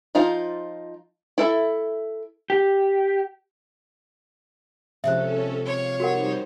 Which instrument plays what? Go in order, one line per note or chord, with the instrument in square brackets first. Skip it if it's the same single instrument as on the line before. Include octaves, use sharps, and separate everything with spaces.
[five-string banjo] F3 D#4 F4 A#5
E4 A4 E5
[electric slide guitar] G4
[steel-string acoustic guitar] C3 F3 G#3 [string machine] C#4 A4 [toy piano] C5 E5
[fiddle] C#5 [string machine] F5
[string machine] G3 D#4 C5 [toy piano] F#4 A#4 F#5